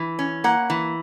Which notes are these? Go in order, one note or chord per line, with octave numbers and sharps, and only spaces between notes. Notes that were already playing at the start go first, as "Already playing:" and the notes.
Already playing: E3
C#4
A#3 F#5
E3